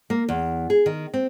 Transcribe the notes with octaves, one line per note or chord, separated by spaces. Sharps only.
A#3
E2
G#4
D#3
C4